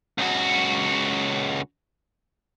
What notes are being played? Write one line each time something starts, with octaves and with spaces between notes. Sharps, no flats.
C#2 F#4